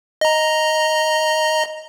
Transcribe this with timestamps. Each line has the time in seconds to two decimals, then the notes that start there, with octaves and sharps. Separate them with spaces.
0.21 D#5 A#5